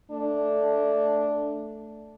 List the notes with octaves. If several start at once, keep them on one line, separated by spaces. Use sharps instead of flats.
A3 D4